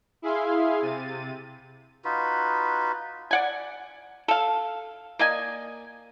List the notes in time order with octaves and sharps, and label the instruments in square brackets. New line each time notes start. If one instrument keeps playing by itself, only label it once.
[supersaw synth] E4 G#4 E5 F5 G#5 C6
C3 A6 D#7
[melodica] D#4 F4 F#4 B4
[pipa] D5 F#5 G#5
A4 F5
A#3 D5 D#5 G#5